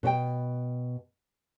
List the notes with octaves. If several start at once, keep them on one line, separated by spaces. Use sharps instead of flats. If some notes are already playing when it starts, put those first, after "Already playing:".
B2 C5 G5